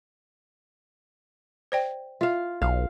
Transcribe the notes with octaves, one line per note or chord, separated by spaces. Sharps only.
C5 D5 G5
F4 E5 F5
B1 F5